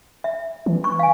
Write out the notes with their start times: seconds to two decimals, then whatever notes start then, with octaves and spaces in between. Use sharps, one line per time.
0.24 E5
0.66 E3
0.84 C#6
0.99 F5 G#5